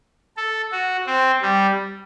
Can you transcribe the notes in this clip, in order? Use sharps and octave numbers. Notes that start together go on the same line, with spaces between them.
A4
F#4
C4
G3